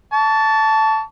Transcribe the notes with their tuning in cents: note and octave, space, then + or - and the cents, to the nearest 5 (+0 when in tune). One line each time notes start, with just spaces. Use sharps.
A5 +0 C#6 +35